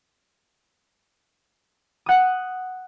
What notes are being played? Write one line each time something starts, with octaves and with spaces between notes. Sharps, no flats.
F#5 D#6